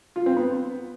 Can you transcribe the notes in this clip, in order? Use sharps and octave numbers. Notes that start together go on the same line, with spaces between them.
F4
C4
B3